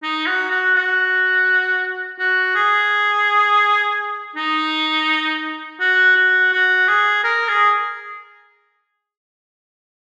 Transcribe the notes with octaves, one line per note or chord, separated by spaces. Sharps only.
D#4
F#4
F#4
F#4
F#4
G#4
D#4
F#4
F#4
F#4
G#4
A#4
G#4